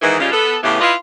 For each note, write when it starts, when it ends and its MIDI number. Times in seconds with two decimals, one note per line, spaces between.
0.02 0.18 44
0.02 0.18 51
0.02 0.18 52
0.20 0.30 49
0.20 0.30 55
0.20 0.30 56
0.20 0.30 61
0.20 0.30 65
0.32 0.56 59
0.32 0.56 69
0.63 0.78 45
0.63 0.78 49
0.63 0.78 52
0.63 0.78 59
0.63 0.78 67
0.81 0.94 64
0.81 0.94 65
0.81 0.94 71
0.81 0.94 75
0.81 0.94 77